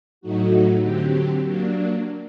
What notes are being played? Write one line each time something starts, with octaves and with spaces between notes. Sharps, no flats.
A2 F#3 A3 D#4 F#4
D3 F#3 C4 G4
F#3 A#3 D4